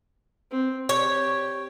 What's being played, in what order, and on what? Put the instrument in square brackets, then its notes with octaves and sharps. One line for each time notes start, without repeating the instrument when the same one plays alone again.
[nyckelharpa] C4
[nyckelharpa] G4 [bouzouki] C#5